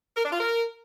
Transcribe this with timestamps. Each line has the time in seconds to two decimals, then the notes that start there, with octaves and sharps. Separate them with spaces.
0.17 A#4
0.25 D4
0.32 F4
0.40 A#4